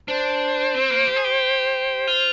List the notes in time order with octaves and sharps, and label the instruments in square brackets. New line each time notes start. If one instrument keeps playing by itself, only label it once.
[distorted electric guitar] D4 [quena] C5
[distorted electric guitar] C4
A#3
G4
G#4
G4
F4